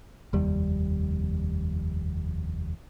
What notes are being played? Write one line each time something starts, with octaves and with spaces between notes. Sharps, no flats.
F1 D#2 G3